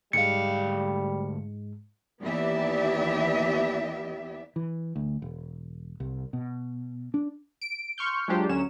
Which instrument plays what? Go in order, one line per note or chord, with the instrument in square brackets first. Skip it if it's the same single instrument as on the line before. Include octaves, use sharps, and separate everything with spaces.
[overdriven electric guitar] D2 F5 [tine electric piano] G#2 G#3 [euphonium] G3 [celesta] C#7
[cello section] D#2 E3 B3 G4 D5 E5
[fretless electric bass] E3
D2
E1
C2
B2
D4
[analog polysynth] D7
C6 C#6 F6 G6
F#3 G#3 D4 F4 G4 C5
D2 F#3 C#4 C#5 E7